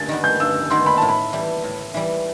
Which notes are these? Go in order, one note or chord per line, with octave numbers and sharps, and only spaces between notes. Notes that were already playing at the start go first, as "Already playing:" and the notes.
Already playing: G2 A6
D#3 G3 B3
G6
G2 E6
D#3 G3 B3 C6
B5
A2 A5
B5
E3 G3
A2
E3 G3